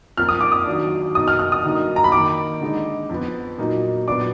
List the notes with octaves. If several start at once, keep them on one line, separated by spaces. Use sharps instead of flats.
F2 F3 A#3 F6
D#6
D6
D#6
D#3 F#3 D4
B2 A#3 D#4 D#6
F6
F6
D#6
D3 F#3 A#3 D#4
A#5
B5
D#3 A#3 D#4 D6
D3 G#3 D#4
F2 F3 B3
A#2 F#3 A#3 D#4
A#2 F#3 B3 D4 D6